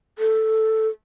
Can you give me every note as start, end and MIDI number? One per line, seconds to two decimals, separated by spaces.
0.19 0.88 69